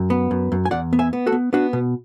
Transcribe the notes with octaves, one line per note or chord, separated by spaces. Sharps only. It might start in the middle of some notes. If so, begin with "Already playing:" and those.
Already playing: F#2
B3
F#2
F#2
G#5
E2 D5 F#5
B3
E5 G#5
B3
F#4 A4
B3
B3 D4 F#4
B2